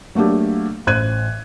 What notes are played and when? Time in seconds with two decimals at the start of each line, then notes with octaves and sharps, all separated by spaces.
0.15 F#3 A3 A#3 D4 G4
0.87 A1 C5 F#6 G#6 D#7